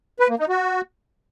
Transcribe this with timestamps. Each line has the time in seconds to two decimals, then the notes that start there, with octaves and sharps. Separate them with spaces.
0.20 B4
0.29 A#3
0.39 D#4
0.49 F#4